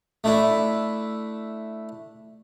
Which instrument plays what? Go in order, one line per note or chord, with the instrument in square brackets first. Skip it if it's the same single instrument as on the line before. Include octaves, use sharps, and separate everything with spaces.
[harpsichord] A3 D4 E4